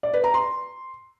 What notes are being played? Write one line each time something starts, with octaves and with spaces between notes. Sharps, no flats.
D5
B4
A#5
C6